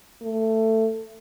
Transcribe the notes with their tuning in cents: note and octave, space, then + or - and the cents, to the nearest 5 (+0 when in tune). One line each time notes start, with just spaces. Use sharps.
A3 +15